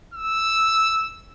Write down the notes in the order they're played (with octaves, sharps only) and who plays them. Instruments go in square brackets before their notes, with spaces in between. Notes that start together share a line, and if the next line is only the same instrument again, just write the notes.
[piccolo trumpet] E6